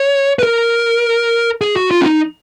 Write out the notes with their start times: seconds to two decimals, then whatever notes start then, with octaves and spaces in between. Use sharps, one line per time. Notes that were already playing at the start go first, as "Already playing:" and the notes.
Already playing: C#5
0.39 B4
0.43 A#4
1.61 G#4
1.76 F#4
1.91 F4
2.01 C#4
2.06 D#4